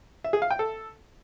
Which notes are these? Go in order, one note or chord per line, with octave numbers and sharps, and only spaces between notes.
E5
G#4
F5
G5
A4